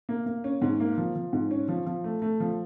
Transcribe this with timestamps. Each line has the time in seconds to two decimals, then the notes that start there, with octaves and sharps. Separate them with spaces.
0.09 A#3
0.26 A#3
0.44 C#4
0.62 G#2
0.80 A#3
0.97 F3
1.15 F3
1.33 G#2
1.51 C#4
1.68 F3
1.86 F3
2.04 A3
2.22 A3
2.40 F3